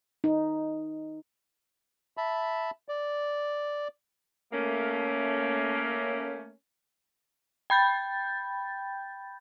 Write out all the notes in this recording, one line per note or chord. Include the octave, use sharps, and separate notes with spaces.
D#4
E5 A5 B5
D5
A3 A#3 C#4
G5 B5 G6 A6